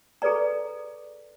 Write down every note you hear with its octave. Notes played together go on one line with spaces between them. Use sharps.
G#4 A4 B4 D5 A#5